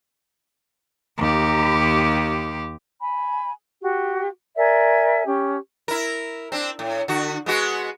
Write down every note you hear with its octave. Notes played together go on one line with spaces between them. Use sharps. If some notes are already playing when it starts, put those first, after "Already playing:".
D#2 G4
G#5 B5
F#4 G4
A#4 D5 E5 G#5
C#4 G4
E4 A#4
C4 D4
A2
D3 F#4
G#3 B3 F#4